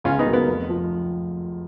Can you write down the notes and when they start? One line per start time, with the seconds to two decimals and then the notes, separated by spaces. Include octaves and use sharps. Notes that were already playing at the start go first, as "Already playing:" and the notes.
0.04 C#2 C#4 F4
0.19 B3 D#4
0.26 B2 F#3 A#3
0.33 B3
0.48 F1
0.69 F3